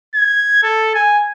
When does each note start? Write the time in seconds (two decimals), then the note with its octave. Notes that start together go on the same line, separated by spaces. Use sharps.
0.15 G#6
0.63 A4
0.95 G#5